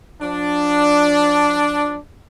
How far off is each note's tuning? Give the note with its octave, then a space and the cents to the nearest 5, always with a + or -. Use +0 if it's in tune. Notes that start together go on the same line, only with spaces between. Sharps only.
F3 +30 D4 +0